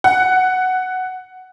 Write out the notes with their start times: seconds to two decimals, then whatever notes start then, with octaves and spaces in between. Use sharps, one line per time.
0.04 F#5